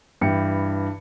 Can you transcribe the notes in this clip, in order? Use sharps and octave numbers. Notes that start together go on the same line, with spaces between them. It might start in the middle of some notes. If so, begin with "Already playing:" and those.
G2 E3 E4 G5 C#7